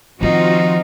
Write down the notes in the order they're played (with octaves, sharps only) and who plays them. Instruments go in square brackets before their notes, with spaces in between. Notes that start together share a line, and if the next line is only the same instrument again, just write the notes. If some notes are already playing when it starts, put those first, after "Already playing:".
[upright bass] D#3 F3 [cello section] C4 F4 F#4 [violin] D#4